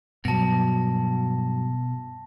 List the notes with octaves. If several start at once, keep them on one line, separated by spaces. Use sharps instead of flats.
G2 B2 F#3 A5 A#6